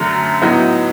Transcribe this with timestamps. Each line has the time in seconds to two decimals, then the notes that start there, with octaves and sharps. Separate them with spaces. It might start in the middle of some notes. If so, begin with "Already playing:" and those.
Already playing: F#2 D3 F#3 A3
0.42 A2 F#3 B3 D#4